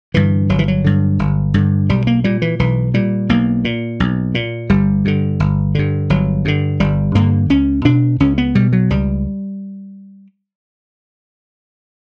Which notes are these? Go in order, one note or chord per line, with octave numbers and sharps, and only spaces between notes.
G2 D3 E3
G1 F#3
E3
F#3
G2 D3
G1
G2 D3
B1 G3
A#3
A#2 G3
E3
B1 E3
A#2 G3
B1 A#3
A#2
B1
A#2
G1 G3
G2 D3
G1
G2 D3
G1 F#3
G2 D3
G1 G3
G2 D3 A#3
C#2 C#4
B2 D4
C#2 C#4
B3
B2 G3
F#3
C#2 G3